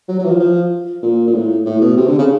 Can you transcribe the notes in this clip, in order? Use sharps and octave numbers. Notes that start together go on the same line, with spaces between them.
F#3
F#3
E3
F3
F3
A#2
A#2
A2
A2
B2
C3
D3
C#3